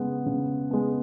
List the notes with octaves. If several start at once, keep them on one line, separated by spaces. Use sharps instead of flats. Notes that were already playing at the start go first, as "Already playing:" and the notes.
Already playing: C#3 G#3 B3 F#5
C#3
G#3 B3